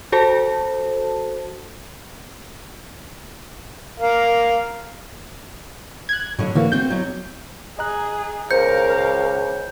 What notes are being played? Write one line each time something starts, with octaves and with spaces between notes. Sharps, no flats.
F#4 A4 C5 A5
A#4 F5
F#6 G#6
A2 D3 F#3
D3 E3 A#3 F#4
C4 F#4 G6
E2 F#3
G#4 D#5 A#5 F#6
C#2 A#4 C5 F5 G6 C#7